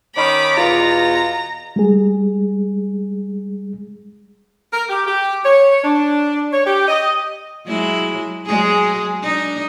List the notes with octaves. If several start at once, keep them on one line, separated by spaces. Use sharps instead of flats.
D#3 C#4 D#4 B5 D6
E2 B2 F4 A#5
G3 G#3 G#4
A#4
G4
G4
C#5
D4
C#5
G4
D#5
F#3 G#3 E4
F#3 G#3 G#4
D4 D#4